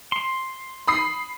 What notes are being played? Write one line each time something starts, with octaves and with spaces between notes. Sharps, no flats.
C6
B5 D#6 C7